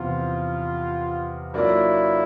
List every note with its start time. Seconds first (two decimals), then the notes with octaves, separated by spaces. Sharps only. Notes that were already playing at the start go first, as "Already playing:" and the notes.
Already playing: E2 C3 F3 F4
1.54 F#3 A#3 D4 E4 F4 A#4